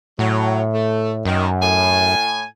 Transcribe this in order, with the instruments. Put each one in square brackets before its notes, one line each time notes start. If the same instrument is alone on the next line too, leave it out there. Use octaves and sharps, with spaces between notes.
[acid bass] A2 [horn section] F#3
[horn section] A3
[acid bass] F#2 [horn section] D#3
[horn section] A2 G#5